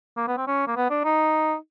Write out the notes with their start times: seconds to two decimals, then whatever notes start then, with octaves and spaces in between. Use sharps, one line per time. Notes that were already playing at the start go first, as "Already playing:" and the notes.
0.17 A#3
0.27 B3
0.37 C4
0.47 C#4
0.67 A#3
0.77 B3
0.90 D4
1.04 D#4